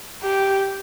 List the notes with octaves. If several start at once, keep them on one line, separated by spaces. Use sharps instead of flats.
G4